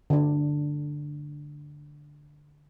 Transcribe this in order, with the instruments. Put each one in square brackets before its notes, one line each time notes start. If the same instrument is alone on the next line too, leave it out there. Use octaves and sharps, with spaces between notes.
[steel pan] D3 D4